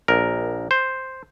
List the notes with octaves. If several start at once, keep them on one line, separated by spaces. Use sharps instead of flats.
A#1 A#4
C5